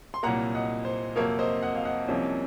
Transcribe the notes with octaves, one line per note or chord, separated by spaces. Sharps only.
C6
C2 A#2 F#3 A#3 F#5 A#5
D#5 F#5
C5
F2 C3 F#3 A#3 A#4 C#5
C5 D#5
D#5 F#5
F5
D#5 F#5
C2 C3 F3 A#3 C#4